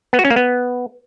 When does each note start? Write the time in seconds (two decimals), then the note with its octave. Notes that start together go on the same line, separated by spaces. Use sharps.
0.13 B3
0.19 F#4
0.25 C#4
0.30 A#3
0.36 B3